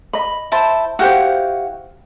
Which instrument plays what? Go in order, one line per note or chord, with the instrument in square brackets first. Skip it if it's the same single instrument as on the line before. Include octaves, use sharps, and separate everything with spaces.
[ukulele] D#5 B5
[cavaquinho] E4 C5 A5
[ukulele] E4 G4 C5 [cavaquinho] F#4 F5 F#5